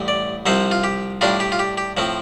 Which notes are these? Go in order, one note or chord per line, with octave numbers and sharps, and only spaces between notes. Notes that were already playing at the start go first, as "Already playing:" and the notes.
Already playing: A1 A2 G3
D5
C2 C3 F3 C4 C5
F4
G4
A2 G3 D4 F4
G4
F4
G4
G4
A2 F3 C4